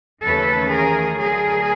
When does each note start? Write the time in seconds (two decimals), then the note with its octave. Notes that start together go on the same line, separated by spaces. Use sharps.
0.23 D#2 C#3 E3 A3 C#4 A4 B4
0.71 G#4 A#4
1.19 D2 D3 F#3 G#4 A#4